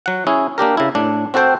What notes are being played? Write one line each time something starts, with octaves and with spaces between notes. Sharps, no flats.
F#3 F#5
C#4 E4 G#4
A#3 D4 G4 A#4
C#3 E4
A2 D4
C4 F#4 A4 C5 G5